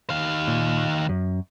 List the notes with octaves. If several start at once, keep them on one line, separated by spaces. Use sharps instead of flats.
D#3 F5
A#2
F#2